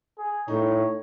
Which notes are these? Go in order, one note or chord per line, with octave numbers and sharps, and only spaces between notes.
G#4
A2 D#4 C#5